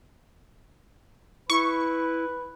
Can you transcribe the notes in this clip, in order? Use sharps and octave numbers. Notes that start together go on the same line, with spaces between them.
E4 B4 C#6